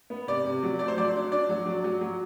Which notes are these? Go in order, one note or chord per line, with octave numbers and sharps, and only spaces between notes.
B3
C3 D5
C3
F#3
A3 D5
C5
F#3 D5
D4
D4 D5
F#3
F#3
F#3
F#3